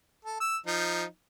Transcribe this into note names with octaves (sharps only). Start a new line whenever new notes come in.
A4
E6
F3 D#4